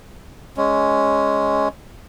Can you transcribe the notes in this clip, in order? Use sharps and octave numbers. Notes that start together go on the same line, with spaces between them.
G#3 C#4